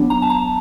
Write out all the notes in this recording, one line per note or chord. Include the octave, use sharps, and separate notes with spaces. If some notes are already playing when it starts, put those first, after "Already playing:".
Already playing: F#3 B3 D4
A#5
A5
A#5